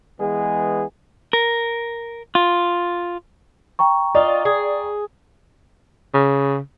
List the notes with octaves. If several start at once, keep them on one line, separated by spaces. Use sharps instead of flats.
E3 G#3 B3 G#4
A#4
F4
G5 A#5 C#6
D#4 F4 D5
G#4
C#3